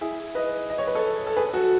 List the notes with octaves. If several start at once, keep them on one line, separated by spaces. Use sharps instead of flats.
E4 G#4
B4 D#5
D#5
C#5
B4
A4 C#5
A4
G#4 B4
F#4 A4